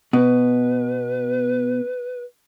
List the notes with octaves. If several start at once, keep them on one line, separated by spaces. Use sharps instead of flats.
B2 B4